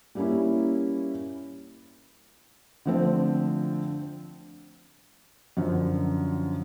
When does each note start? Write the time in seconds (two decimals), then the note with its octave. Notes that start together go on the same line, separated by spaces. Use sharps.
0.15 G3 A#3 C#4 E4
2.85 D3 F3 A3 C4
5.57 F#2 D3 F3